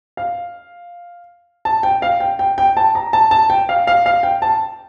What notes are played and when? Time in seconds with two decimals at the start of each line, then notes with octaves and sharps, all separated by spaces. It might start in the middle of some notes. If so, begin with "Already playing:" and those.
0.17 F5
1.65 A5
1.83 G5
2.02 F5
2.20 G5
2.39 G5
2.58 G5
2.77 A5
2.95 A#5
3.13 A5
3.31 A5
3.50 G5
3.69 F5
3.87 F5
4.06 F5
4.23 G5
4.42 A5